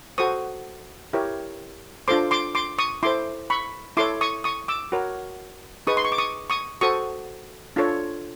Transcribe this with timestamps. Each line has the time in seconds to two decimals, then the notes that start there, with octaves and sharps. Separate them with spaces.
0.18 F#4 A4 C5 C#6 D#6
1.13 E4 G4 A#4 C#5
2.08 D4 F4 A4 C5 C6 D6
2.31 C6 D6
2.55 C6 D6
2.79 C#6 D#6
3.03 E4 A4 C5 C6 D6
3.50 B5 C#6
3.97 E4 A4 C#5 C6 D6
4.21 C#6 D#6
4.44 C#6 D#6
4.68 D6 E6
4.92 F#4 A#4 C#5
5.87 D#4 G#4 B4 C#6 D#6
5.97 C6
6.05 C#6
6.12 D6
6.18 C#6 D#6
6.50 C#6 D#6
6.81 F#4 A4 C5 C#6 D#6
7.76 D4 F4 A4 C#5